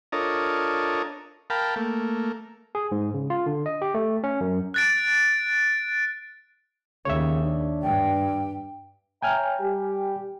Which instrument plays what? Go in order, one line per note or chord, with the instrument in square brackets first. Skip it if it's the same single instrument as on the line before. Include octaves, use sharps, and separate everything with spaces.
[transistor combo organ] D4 F4 A4 A#4 C#5 D#5
A#4 F5 G5 A5 B5
A3 A#3
[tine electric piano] G#4
G#2
C#3
F4
D3
D#5
G4
A3
C#4
F#2
[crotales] F#6 A6 D7
[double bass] D#2 [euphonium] C#3 [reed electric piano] C#5 E5
[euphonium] D4
[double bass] G2 [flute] G5
[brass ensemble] C#5 E5 A#5 [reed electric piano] G5 G#5 F6
[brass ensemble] G3 G4